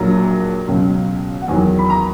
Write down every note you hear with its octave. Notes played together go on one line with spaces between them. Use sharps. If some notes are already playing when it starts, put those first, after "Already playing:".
Already playing: A#1 A#2 F#3 A#5
C#2 B2 F#3
F#5
E2 D#3 F#3 G#5
B5
A#5